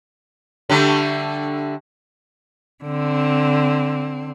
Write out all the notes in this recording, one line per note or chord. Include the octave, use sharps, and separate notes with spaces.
D3 G3 A3
D3 C4